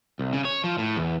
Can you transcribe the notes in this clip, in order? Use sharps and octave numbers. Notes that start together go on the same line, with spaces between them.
C2
C#3
C#5
F3
A2
E2